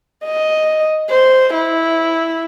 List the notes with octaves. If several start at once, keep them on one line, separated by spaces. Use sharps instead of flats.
D#5
C5
E4